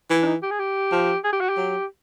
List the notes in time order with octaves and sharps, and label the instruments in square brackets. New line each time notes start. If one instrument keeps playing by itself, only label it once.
[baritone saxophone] E3
[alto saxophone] D4
D#4
G4
G#4
G4
[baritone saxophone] F3
[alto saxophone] G#4
G4
F#4
G4
[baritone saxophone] F#3